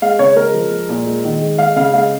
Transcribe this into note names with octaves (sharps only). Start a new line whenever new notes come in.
G#3 F5
C#3 C#5
G#3 A#4
F3
G#3
A#2
G#3
D#3
G#3
G#3 F5
C#3 F5
G#3 F5